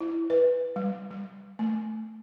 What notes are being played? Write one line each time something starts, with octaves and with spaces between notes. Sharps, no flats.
E4
B4
G3
G3
A3